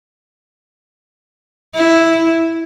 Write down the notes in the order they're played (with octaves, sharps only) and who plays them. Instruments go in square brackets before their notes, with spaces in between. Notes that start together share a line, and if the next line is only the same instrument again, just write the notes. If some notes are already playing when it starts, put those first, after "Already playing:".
[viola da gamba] E4